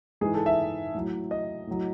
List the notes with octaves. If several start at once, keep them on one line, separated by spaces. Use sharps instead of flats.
G#2 E3 G#3 G#4
A4
E5
A2 F#3
D#5
A2 F#3